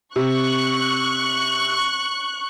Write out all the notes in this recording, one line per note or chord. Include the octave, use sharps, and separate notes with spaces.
C3 C#6 F#6